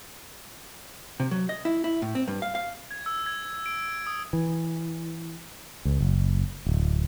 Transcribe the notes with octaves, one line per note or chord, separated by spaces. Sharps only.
C3
F#3
D#5
E4
E4
A2
C4
G2
F5
F5
G#6
E6
G#6
D7
D#6
E3
C#2
F#1
D1